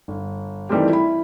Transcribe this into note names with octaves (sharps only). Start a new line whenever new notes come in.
G1
D#3 E3 G3 A3 C4 G4
E4 B5